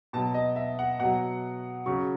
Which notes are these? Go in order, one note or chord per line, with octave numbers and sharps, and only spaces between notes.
B2 F#3 A5
D#5
E5
F#5
B2 F#3 F#5
C#3 F#3 C#6